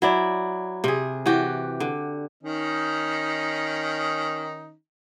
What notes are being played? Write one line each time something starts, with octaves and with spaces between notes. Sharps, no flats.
F#3 E4 D5
C3 G#4
E3 F#4 G4
D3
D#3 C#4 D#4